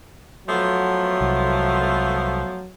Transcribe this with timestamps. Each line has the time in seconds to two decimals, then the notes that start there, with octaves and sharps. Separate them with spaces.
0.48 F3 F#3 A3 B3
1.21 C2